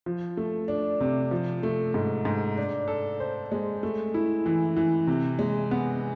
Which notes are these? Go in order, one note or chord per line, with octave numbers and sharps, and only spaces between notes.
F3
A3
D4
C3
F3
A3
G#2
G#2
D4
A4
C5
G#3
A3
E4
E3
E3
C3
G#3
B3